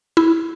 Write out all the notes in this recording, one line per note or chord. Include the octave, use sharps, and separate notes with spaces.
E4